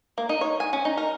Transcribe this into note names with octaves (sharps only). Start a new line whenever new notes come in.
A#3
D#4
C#5
G#5
C#4
D#4
A#4